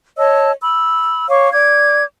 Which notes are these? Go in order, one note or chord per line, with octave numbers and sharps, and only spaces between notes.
C#5 D#5 A5 E6
B5 E6
C#5 F5 C#6 D6
D5 D6 G#6